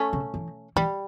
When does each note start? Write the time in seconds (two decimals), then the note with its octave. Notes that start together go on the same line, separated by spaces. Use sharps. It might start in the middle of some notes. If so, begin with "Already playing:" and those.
Already playing: A3 C#4
0.13 C#3
0.34 E3
0.76 E3 G3